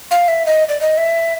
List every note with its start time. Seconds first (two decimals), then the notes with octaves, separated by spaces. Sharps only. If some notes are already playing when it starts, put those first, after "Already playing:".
0.11 F5
0.28 E5
0.46 D#5
0.69 D5
0.81 D#5
0.97 E5